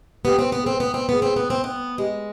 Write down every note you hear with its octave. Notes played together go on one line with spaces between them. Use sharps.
B3 G4
C4
B3
G#4
C4 B4
B3
C4
B3 G#4
C4
B3
C4
B3
G#3 G4